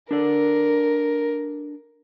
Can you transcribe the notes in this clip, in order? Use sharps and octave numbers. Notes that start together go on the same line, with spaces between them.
D4 A4 A#4 D5